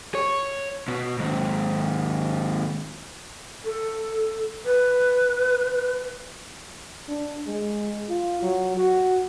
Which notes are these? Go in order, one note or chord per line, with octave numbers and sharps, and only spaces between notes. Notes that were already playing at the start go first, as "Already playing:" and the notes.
C#5
B2
D#2 G#2
A4
B4
D4
G#3
F4
F#3
F#4